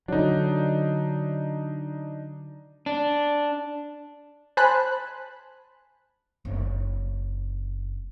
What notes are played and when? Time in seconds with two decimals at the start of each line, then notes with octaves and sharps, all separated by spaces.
0.08 D3 F#3 D4 D#4
2.86 D4
4.57 C5 G#5 A5 B5 F#6
6.45 F#1 C4